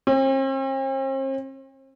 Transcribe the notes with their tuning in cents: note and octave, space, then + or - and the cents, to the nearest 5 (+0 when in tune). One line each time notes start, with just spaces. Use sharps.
C4 +45